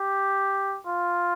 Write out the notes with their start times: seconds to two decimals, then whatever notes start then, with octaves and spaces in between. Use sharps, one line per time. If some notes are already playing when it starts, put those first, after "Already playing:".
Already playing: G4
0.87 F4